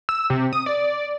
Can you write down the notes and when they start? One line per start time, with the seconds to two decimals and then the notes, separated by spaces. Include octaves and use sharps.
0.09 E6
0.30 C3
0.53 D#6
0.66 D5